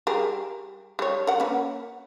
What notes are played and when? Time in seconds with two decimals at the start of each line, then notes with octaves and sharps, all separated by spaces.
0.07 G3 G#4 A#4
0.99 G3 C#5
1.27 A#4 F#5
1.40 A#3 C#4 B4